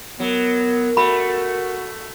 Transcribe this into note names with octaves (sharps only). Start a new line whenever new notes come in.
F#3 B3 A#4
A3 F#4 B5